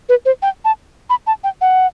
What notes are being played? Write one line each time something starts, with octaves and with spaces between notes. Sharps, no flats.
B4
C5
G5
A5
B5
A5
G5
F#5